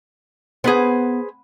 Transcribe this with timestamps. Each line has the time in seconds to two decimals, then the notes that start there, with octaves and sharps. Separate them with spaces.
0.64 B3 G#4 B4 C5